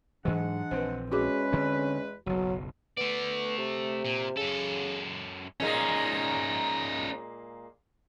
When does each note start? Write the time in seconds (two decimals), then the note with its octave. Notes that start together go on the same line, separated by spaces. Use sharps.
0.25 G#2 E3 F#3 G#3 D4 F#5
0.71 A#1 C4 B4 C5
1.12 E2 G#3 C#4 F#4 G#4 B4 D6
1.53 D3 C4
2.26 F#1 B1 F#3
2.97 A3 B3 D5
3.58 C3
4.05 A#2
4.37 F#2 C#3 A4
5.60 A#2 G#3 A#3 C#4 D#4